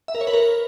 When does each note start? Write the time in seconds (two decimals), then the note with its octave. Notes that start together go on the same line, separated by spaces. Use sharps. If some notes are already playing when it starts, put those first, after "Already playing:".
0.08 E5
0.15 A#4
0.21 C#5
0.27 B4
0.33 A#4